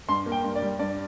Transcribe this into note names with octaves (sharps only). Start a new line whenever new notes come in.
G2 C6
A#3
G5
G2
D5
G3
G2 D5